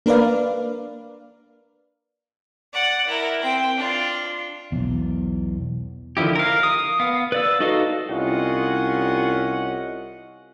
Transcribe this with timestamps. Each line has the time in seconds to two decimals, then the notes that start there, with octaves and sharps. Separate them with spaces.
0.06 A#3 D4 A#4 B4 D5 F5
2.73 D5 F#5
3.08 E4 A#4
3.41 C4 G5
3.77 D4 F4
4.72 B1 E2
6.17 D3 D#3 F3 E4 G4
6.36 A#4 F5
6.63 D#6
7.00 B3 F5
7.32 B4 D5 E6
7.60 D#4 F#4 A4 D#5 F5
8.09 C2 C#4 F4 D#5 F#5